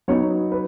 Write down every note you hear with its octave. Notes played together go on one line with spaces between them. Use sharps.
F#3 B3 D#4 C#5
B4